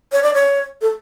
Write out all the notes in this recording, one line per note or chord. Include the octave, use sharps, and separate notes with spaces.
C#5
D5
C#5
A4